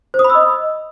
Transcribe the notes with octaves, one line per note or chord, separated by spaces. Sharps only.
C5
D#6
B5
E6
D#5